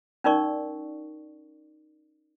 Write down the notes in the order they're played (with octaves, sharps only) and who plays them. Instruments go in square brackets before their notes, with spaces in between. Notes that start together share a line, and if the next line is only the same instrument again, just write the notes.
[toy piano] C#4 D#4 A#4 D5 C#6